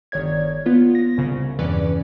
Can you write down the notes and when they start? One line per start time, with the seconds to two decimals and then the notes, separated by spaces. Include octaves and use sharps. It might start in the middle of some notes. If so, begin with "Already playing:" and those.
0.12 G1 D#3 C#5 D5 G#6
0.66 B3 F4
0.95 A#6
1.17 C2 C#3
1.59 E2 G2 E3 C#4 B4 D5